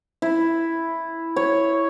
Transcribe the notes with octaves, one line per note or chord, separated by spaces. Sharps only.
E4
C#5